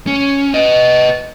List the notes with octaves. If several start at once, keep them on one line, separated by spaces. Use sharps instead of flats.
C#4
B4 D#5